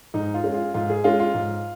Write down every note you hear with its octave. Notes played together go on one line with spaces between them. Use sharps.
G#2 D#4
F4
G#3 C#4
F4
G#2 F4
G#4
G#3 C#4 F4
F4
G#2